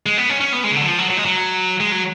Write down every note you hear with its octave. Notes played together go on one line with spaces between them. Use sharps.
G#3
B3
C#4
C#4
B3
G#3
C#3
D3
F#3
F3
F#3
F#3
G#3
F#3
G#3
F#3